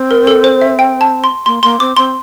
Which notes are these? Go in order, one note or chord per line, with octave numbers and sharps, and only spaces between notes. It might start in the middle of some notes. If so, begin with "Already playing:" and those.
Already playing: C4
A#4
A4
C5
E5
G5
A5
C6
A#3 C6
A#3 C6
C4 D6
C4 C6